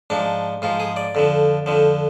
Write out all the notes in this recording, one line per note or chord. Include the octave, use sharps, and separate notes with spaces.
G#2 F3 D4
G#2 F3 F4
G#4
D5
F2 D3 F3
F2 D3 F3